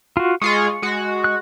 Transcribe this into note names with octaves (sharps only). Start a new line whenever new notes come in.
F4 F#4
G#3 F4 G#4 C#6
G#3 F#4
F#6